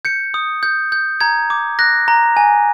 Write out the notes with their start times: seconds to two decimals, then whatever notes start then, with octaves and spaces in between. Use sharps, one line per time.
0.05 G6 C#7
0.34 D#6
0.63 G6
0.92 G6
1.21 A#5 G#6
1.50 D6
1.79 F#6 A#6
2.08 A#5
2.37 G#5